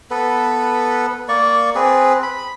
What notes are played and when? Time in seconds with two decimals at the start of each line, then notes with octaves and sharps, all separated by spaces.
0.11 B3 A4 B4
1.28 A#3 D5 C#6
1.75 C4 G#4 B4
2.23 B5